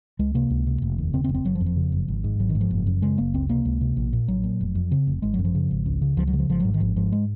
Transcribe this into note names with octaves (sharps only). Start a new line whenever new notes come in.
C#2 G#3
C3 A#3
C#2
C3
F1
D#2
C#3 C4
C4
F1
C4
F#1 F#3
F3
F2
F3
C#3
F#1
G#1
G#2
G#1 F#3
D#3
G#2
F3
F#1
F#2
C#3 G#3
F#1 A#3
C#2 C4
C3 A#3
C#2
C3
A#1
A#2
A#1 F#3
A#2
F1
F2
C#3 C4
F1
G#1 G#3
F#2 F#3
F3
C#3
G#1
C#2
C#3
C#2 F3
F#3
C#3
F3
G#1 F3
G#2 F#3
D#3
G#1 F3
G#2 F3
G#3